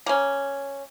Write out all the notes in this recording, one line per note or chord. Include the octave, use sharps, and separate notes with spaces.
A#3 C#4